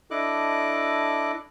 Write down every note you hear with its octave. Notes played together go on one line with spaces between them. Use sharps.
D4 E4 A4 D#5 D6 F#6